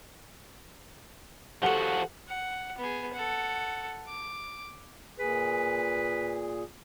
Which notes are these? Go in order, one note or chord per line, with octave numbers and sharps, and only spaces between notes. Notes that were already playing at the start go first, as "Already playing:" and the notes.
F3 F#4 G4 A4 F#5 C#7
F#5
B3 G#4
A4 F#5
D6
A#2 G#4 B4